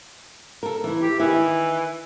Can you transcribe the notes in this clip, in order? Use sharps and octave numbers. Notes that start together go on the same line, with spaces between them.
A4 A#4
E3 E4
G4
D#3 E3 E4